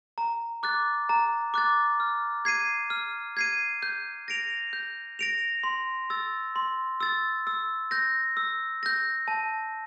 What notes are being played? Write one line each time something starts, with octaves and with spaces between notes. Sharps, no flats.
A#5
D6 F#6 A6
A#5
D6 F#6 A6
F6
G#6 C7 D#7
F6
G#6 C7 D#7
G6
A#6 D7 F7
G6
A#6 D7 F7
C6
E6 A6
C6
E6 A6
E6
G6 A#6
E6
G6 A#6
A5